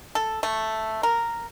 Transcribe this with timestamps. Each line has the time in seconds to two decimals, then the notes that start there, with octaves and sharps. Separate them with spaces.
0.15 A4
0.43 A3
1.03 A#4